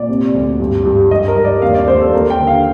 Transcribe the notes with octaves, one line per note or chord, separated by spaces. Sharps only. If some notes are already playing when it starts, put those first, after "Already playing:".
Already playing: A#2 D5
C3
D2
G2
G2
G2 D#5
A#4
G2
D5
D#2 F5
D5
D#2 C5
A4
D#2 A#4
G5
D3
F5